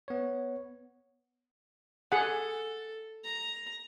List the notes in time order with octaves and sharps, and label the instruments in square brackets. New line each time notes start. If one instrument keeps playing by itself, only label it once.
[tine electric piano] B3 C#5
[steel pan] G#4 F#5 [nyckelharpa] A4
[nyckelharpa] A#5